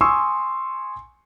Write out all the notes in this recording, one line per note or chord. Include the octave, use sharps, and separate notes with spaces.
G#5 C6 C#6 D#6 E6